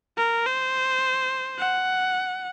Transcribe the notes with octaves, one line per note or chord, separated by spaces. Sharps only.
A#4
C5
F#5